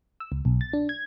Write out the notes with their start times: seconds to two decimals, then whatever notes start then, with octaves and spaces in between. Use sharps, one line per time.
0.20 E6
0.32 C#2
0.45 B1
0.61 A6
0.73 D4
0.89 G#6